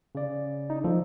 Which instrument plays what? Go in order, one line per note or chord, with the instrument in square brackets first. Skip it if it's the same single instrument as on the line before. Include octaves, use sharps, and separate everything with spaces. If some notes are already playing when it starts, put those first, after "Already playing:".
[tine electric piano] C#3 D5
[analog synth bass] D#4
[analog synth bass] F3 [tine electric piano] A#3 F4 A4